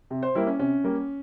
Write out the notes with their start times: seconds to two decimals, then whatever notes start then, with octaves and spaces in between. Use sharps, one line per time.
0.10 C3
0.23 C5
0.35 G3 A#3 E4
0.47 C#4
0.59 C3 C#4
0.84 G3 A#3